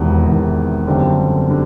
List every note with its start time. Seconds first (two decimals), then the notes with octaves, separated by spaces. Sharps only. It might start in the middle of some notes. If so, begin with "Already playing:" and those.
Already playing: E1 E2 C3 D#3
0.26 E1 E2 C3 D#3
0.87 G1 F#2 D3 G3 C4
1.50 D3 G3